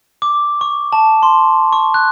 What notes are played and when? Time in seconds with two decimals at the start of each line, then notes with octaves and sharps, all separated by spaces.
0.22 D6
0.61 C#6
0.93 A5
1.23 C6
1.73 C#6
1.94 F#6